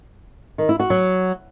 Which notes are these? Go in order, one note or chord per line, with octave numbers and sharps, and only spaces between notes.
D#3
E4
F#4
F#3